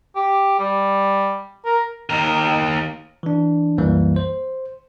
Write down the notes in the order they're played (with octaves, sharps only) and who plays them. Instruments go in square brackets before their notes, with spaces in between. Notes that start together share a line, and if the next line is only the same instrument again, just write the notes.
[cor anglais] G4
G3
A#4
[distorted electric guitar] D#2 A#4
[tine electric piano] E3 D4
C2 F#2 E3 G3 A#3
C5